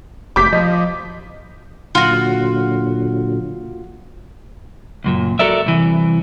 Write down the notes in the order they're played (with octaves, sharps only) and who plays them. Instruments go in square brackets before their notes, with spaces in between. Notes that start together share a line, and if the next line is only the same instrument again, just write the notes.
[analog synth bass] F1 [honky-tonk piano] D6 G6 B6
[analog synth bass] F3 [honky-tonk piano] D#5
[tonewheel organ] A#2 D3 F#3 [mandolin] F4 F#4
[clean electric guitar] C#2 F#2 A#2
F#4 A4 A#4 D5 E5
C2 E3